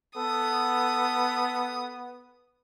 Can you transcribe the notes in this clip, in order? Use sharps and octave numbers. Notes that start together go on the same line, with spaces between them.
B3 A4 D#6